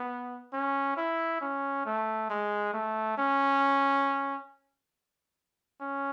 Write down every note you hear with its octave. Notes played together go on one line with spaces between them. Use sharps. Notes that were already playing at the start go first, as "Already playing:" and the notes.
Already playing: B3
C#4
E4
C#4
A3
G#3
A3
C#4
C#4